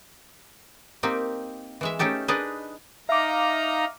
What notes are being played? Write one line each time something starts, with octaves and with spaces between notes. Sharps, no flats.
A#3 C4 D#4 G4
E3 G#3 E5
A3 C#4 D#4 G4 A4
D4 D#4 G#4 B4 D#5
D#4 E5 F5 A#5 D6